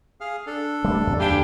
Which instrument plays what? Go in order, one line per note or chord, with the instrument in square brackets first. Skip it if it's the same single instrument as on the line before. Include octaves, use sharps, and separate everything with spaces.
[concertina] G#4 F5 F6
D4 A4
[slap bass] G3 A3
E2 F3
[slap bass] D2 [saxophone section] D4 G4 [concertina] F5 G#5 B5